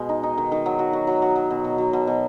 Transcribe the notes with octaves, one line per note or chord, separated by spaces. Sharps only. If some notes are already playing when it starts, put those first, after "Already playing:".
Already playing: B2 G#3
D#4
D#4
D#3
D#3
F#3
F#4
F#4
F#3
F#3
F#3
B2
B2
F#3
B2
B2